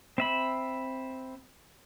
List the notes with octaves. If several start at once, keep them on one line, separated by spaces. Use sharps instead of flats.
C4 E5 B5